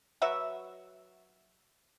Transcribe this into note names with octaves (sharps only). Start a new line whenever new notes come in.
F#3 F#4 B4 E5